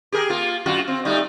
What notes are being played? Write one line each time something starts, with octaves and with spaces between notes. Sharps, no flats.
G4 G#4 A#4
A#3 F4
F#2 F4 F#4
C4
G3 A3 D#4